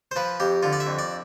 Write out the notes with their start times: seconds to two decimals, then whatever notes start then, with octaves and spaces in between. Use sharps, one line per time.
0.11 C5
0.16 F3 B4
0.40 F2 G4
0.63 D3 F4
0.73 D5
0.80 E5
0.87 F2
0.99 D5